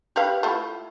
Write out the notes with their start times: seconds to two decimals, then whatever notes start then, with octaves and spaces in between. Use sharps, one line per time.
0.16 G4 B4 F5
0.43 A3 E4 F4